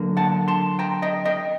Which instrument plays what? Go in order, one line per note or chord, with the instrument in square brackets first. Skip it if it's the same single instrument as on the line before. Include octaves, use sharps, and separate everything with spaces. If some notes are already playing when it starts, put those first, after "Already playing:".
Already playing: [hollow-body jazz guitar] D3 F#3 A#3
F#5 A5
A5 C6
G5 A#5
D#5 G5
D#5 G5